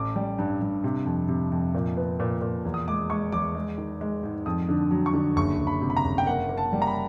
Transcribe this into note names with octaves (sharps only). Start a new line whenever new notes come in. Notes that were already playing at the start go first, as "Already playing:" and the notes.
Already playing: A1 D6
G3
G2
G2
C3
F2
C3
F2
A#2
B3
A#2
A#2
E2
D#6
G#3 D6
G#3 C#6
E2 D6
G#3
D#3
G#3
G#2
F2 D#6
D3
F#3
C#6
D3
F#1 C#6
F#1
B5
C3
B5
A#5
F#1
G5
A#3 F#5
A#3
A5
G3
A#5
B5